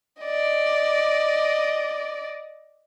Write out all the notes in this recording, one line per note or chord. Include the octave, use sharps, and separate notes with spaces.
D5 D#5